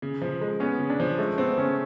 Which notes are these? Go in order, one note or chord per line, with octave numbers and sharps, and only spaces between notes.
C#3
F3
G#3
B3 C#4
C#3
D4
F3
G#3 A3
B3 C4
C#3 C#4